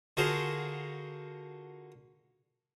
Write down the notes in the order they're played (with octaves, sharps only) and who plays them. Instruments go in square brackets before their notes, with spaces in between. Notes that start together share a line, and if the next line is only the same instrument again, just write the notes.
[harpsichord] D3 F4 F#4 G#4 A#4 C5